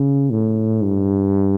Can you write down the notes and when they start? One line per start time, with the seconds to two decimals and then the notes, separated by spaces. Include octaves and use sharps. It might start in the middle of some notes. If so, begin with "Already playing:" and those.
Already playing: C#3
0.31 A2
0.83 G2